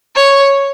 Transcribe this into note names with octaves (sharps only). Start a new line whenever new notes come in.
C#5